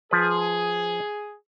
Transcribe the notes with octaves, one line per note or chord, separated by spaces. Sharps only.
F3 G#4 B4